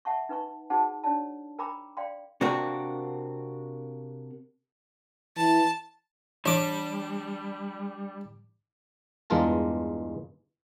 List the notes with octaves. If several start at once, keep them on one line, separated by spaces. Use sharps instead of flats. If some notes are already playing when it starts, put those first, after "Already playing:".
E5 F#5 A5 C#6
D#4 B4 G#5 C#6
D#4 F#4 G#4 C5 F#5 A5
D4 C#5 D5 A5
A#4 G5 G#5 A#5 B5 D6
D5 F5 G5 C6
C3 A#3 C4 D4 F#4
E3 A5
E3 G3 D4 D6
E2 G2 G#3 F4 A#4 A5